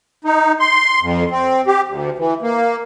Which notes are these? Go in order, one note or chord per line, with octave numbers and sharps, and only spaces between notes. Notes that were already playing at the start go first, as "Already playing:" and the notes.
D#4
C6
F2
C4
G4
D2
E3
A#3